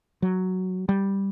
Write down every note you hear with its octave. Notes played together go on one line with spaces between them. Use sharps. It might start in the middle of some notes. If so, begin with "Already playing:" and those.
F#3
G3